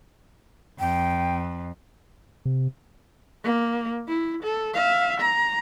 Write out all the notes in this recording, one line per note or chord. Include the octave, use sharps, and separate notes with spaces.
F2 G5
C3
A#3
E4
A4
E5 F5
A#5